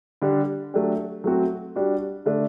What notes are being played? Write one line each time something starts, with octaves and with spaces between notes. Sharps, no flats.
D3 G3 D4
F#3 A3 D4 G4
F#3 A3 C4 F#4
G3 D4 F#4
D3 A3 D4